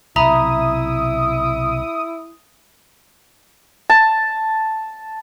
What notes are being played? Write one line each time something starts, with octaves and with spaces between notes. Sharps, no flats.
B1 C3 E4 E5 A#5 B5 D#6
A5